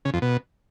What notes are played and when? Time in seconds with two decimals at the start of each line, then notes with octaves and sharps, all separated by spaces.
0.05 C#3
0.14 F2
0.22 B2